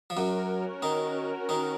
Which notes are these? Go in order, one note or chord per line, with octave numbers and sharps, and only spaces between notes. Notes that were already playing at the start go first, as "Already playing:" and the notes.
F3
F#2 F#3 C#4 F#4 A#4
D#3 D#4
D#3 D#4